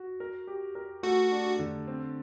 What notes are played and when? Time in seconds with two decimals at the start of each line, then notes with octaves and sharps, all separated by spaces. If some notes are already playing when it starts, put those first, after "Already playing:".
Already playing: F#4
0.20 A#4
0.47 G4
0.75 A#4
1.03 A3 F#4
1.32 D4
1.59 D3
1.87 C4